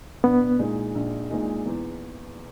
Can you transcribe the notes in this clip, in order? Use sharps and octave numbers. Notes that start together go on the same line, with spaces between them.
A#1 B3
A#2 G#3 D#4
A#1
A#2 G#3 D#4
E2